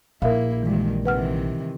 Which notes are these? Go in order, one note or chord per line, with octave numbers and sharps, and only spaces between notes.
A#1 A#3 E4 A#4 E5 F5
G2 A#2 D#3 E3 G#3
C3 D#3 E3 B4 F#5 F6